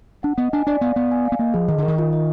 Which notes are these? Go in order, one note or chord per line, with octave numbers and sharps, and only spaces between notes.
D4 F#5
B3 D#5
D4 G#5
D4 D5
B3 F5
B3 D5
G#5
F5
B3
A#3 D#5
F3 G#4
D#3 D#5
D3
A#4
D#3
F4
D#5